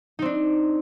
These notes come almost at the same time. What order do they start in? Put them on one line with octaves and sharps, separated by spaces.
D#4 C4 D4